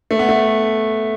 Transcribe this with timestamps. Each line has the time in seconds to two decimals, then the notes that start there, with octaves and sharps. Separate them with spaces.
0.11 A3
0.19 B3
0.29 A3